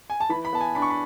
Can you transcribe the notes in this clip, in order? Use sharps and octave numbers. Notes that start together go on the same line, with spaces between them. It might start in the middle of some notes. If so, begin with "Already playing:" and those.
G#5
A5
E3 B5
B5
B3 A5
G#5
D4 B5
C#6
B5